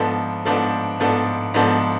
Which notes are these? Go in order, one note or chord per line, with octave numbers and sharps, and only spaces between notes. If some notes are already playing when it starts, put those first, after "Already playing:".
Already playing: G#2 F3 B3 D4 A4
G#2 F3 B3 D4 A4
G#2 F3 B3 D4 A4
G#2 F3 B3 D4 A4